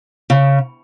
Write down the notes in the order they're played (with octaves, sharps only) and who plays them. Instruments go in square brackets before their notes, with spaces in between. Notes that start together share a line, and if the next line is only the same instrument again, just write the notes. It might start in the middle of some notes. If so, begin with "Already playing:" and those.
[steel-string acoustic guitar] C#3